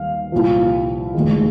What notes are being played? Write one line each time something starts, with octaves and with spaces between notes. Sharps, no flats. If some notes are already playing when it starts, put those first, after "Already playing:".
Already playing: D#2 D#3 G3 F5
C2 A#2 F3
F1 D#2 D#3 G#3